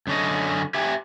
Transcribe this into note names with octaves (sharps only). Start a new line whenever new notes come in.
F#2 D3 C#4 D#5
G4 E5 G5 G#5